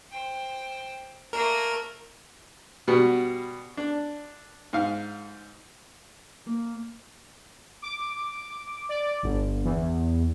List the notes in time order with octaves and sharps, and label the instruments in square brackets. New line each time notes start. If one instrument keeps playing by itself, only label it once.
[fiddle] C5 G5
[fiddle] A3 A#3 [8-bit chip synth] A#4
[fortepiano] B2 G3 B3
D4
G#2 F5
[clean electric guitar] A#3
[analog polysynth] D6
D5
G1
E2